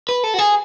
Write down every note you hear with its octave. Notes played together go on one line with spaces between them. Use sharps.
B4
A4
F#4
G#4